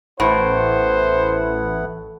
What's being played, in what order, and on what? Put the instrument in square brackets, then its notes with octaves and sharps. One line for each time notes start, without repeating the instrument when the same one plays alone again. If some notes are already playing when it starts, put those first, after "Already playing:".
[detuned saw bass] A1 [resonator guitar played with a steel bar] A2 [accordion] B3 E4 F#5 [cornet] C5